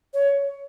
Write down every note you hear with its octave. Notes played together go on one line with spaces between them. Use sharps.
C#5